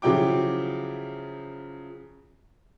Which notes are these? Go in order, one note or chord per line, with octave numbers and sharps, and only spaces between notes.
C#3 F3 F#3 E4 G5 D6